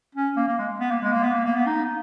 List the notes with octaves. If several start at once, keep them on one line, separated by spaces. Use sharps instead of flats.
C#4
A#3
A#3
G#3
B3
A#3
G#3
A#3
B3
A#3
A#3
B3
D#4